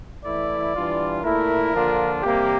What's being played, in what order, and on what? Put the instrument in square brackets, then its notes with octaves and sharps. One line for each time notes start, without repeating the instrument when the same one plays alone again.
[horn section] E3 A3 E4 [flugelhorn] D5
[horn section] E3 G3 D4 F4
[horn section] A#2 A3 E4 [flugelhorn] A#4
[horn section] D3 F3 A#3 D4 F4
[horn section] C3 G3 A#3 [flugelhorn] G4